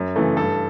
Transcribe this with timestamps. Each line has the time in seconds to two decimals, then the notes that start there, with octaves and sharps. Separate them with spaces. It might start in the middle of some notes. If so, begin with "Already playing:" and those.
Already playing: F#2
0.16 C#3 E3 A3
0.37 G2 A4